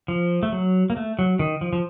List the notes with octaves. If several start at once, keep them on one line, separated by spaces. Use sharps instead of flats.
F3
A3
F#3
A#3
A3
F#3
D#3
F3
F3